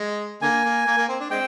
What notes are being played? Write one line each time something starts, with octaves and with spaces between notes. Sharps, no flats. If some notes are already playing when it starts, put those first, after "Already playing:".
Already playing: G#3
D3 A#3 G#5
A#3
A#3
A#3
C4
D4
G#3 C4 G5